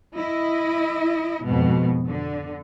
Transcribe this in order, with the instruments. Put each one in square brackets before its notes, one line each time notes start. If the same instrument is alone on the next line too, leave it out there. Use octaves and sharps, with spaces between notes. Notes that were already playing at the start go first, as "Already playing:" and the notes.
[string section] E4 D#5
F2 G#2 B2
D3